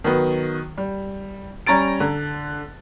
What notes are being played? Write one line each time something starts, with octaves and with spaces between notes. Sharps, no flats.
D#3 F#3 B3
G3
G3 C#4 A#5 A6 D7
D3